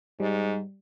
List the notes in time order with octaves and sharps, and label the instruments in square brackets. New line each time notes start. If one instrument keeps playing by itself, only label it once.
[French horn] G#2 [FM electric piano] G3